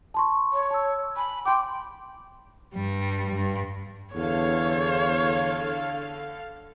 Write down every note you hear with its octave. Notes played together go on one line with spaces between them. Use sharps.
A5 C6 C#6
C#5
A5 E6
G#5 B5
G5 C6 D6
G2 G3
G2
E2 D3 A4 C#5 F5